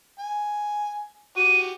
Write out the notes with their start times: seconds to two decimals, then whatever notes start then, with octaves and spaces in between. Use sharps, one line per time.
0.19 G#5
1.37 F#4 G4 D#7